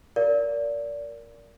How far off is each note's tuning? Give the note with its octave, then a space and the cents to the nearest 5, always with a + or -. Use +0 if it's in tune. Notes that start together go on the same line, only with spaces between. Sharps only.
A#4 +0 D5 -25 F5 +0